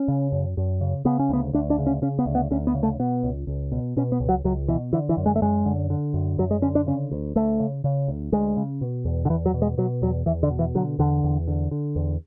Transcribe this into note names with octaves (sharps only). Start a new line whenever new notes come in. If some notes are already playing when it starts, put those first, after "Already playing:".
Already playing: C#4
C#3
F#2
F#2
C#3
C#3 B3
C#4
D2 B3
D2 D4
D4
C#3
C#4
C#3 C#4
B3
D2
B3
D2 C#4
B3
C#3
A3
B2 B3
C#2
C#2
B2
B2 C#4
B3
C#2
F#3
C#2 F#3
B2 E3
D3 E3
E3
F#2
G#3
A3
F#2 G#3
D3
D3
F#2
F#2 F#3
G#3
D3 C#4
D4
C#3 C#4
D2
D2 A3
C#3
C#3
D2
D2 G#3
C#3
B2
E2
D3
E2 E3
F#3
B2
G#3
B2 F#3
E2 F#3
E2 E3
D3
B2
E3
D3 F#3
E2 D3
E2
D3
D3
E2